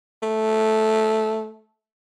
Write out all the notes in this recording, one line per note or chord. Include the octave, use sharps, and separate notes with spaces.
A3